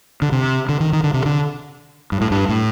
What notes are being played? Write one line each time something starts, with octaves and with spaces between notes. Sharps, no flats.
D3
C3
D3
D#3
D#3
D3
C3
D3
G2
A2
G2
A2